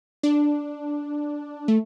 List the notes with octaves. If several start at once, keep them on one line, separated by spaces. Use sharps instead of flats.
D4
A3